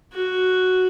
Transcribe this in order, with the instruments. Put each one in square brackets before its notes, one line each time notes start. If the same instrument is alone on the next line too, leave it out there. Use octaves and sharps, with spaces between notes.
[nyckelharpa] F#4